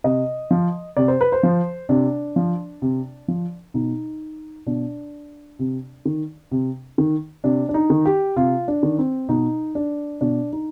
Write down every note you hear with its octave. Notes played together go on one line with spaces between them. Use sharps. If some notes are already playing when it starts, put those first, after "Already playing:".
C3 D#5
F3
C3 D5
C5
B4
C5
F3
C3 D4
F3
C3
F3
B2 D#4
B2 D4
C3
D#3
C3
D#3
C3 D4
D4
D#4
D#3
G4
C3 F4
D4
D#3
C4
B2 D#4
D4
B2 D4
D#4